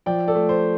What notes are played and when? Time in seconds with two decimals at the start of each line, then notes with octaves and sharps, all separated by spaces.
0.06 F3 D5 G5
0.28 A4 D5
0.35 A3
0.49 C5